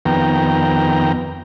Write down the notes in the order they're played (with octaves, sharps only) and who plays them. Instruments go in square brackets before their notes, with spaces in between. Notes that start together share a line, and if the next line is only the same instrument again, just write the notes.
[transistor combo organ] F2 D#3 B3 G5 A#5